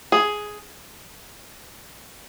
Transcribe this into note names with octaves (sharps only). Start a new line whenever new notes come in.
G#4